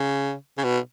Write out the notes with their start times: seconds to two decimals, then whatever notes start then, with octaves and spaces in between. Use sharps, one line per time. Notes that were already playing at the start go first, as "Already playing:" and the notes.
Already playing: C#3
0.58 C#3
0.64 B2